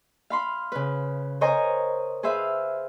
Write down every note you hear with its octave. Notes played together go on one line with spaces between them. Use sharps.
F5 B5 C6
C#3 B4
A#4 C5 C#5 D#5 G#5 A#5
G#4 B4 C5 E5 F5